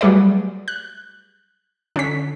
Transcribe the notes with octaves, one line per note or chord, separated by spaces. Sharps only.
F#3 G3 A3 G#4 B4 D5
F#6
D3 C#4 B6